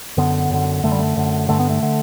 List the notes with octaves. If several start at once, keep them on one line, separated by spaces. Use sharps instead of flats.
F#2 D3 B3
F#2 D3
F#2 D3 A3
G3
A3
F#2 D3
G2 D3 A3
B3
A3
D3